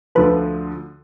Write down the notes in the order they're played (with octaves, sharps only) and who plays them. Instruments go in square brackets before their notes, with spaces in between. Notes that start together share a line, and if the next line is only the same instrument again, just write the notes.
[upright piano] D2 D3 F3 [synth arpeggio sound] B4